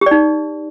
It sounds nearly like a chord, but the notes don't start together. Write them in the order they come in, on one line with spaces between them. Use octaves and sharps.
G4 D5 D#4